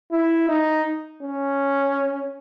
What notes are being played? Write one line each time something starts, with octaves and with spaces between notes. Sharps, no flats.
E4
D#4
C#4